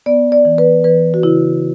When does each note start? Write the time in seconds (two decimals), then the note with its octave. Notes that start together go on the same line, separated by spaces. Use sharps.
0.06 B3 D5
0.32 D5
0.45 E3
0.58 B4
0.84 E3 B4
1.14 F#4
1.23 C#3 E4